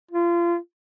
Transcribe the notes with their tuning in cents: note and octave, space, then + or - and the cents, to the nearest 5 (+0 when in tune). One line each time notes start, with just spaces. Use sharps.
F4 -30